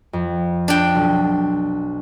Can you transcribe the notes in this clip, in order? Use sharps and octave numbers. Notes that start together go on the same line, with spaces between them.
F2
D4 G5
B1